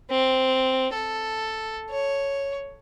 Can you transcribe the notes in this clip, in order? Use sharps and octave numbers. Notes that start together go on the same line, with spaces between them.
C4
A4
C#5